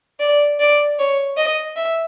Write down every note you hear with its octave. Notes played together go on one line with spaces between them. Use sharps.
D5
D5
C#5
D#5
E5